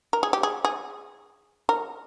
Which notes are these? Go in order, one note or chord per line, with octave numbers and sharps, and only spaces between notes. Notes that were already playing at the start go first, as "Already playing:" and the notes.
A#4
G#4
G4
G#4
G#4
A#4